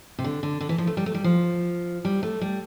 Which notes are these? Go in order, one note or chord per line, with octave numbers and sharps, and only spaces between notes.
C3
D3
D3
D3
E3
F3
A3
G3
A3
G3
F3
G3
A3
G3